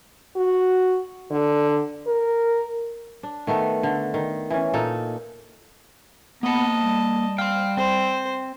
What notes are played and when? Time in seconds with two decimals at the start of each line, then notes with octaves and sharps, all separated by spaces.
0.36 F#4
1.31 D3
2.07 A#4
3.23 D4
3.47 D#3 A3 B3 A4
3.83 D3
4.14 D#3
4.50 E3 C#4
4.73 A#2 D#4 A4
6.43 A#3 B3 D#5 A5 B5
6.81 G3
7.38 F5 G5 C6
7.77 C4 C5